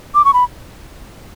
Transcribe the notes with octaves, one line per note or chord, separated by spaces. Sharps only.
D6
C#6
B5